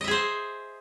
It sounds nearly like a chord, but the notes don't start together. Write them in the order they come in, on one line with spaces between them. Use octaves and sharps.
D#5 E5 G#4 C5